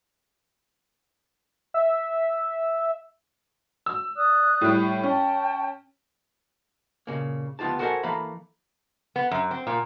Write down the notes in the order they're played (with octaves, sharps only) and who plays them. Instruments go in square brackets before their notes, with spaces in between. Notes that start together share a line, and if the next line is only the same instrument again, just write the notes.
[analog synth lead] E5
[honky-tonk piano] E6
[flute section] D5 D#6 F#6
[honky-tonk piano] A2 G3
[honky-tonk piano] C#4 [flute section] G5 A5
[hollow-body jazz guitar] A#2 C#3 A#3
D2 B3 F4 G4 A5
F#4 A4 A#4 C5 F#5 G#5
E3 A#3 A4 F5 A#5 B5
[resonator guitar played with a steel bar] B3
F#2
C4
A#2